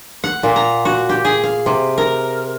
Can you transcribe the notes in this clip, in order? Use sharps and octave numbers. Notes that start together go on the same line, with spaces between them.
F#5
A#2
A#5
F#4
G4
G#4
F5
C3
A#4